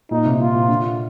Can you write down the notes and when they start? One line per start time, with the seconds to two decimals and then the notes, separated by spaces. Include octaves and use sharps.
0.11 A#2 D#4
0.25 C3
0.40 A#2 F4
0.55 A#2
0.68 D3